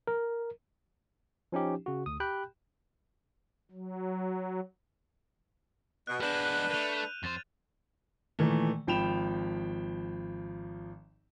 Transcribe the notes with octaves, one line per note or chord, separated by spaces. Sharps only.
A#4
F3 C#4 D#4 G4
C#3 F#4
D2 D#6
G4 G5 B5 F#6 G6
F#3
B2 F#6
G#3 B3 D4 B4 F6 G6 E7
A3 A#3 D#7 F7
F2 C5 A6
A#2 D#3 E3 A3
G#1 F3 G5 B5 E7 F7